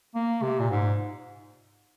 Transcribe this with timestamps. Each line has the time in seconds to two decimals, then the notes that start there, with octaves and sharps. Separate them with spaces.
0.15 A#3
0.42 C3
0.60 A#2
0.70 G#2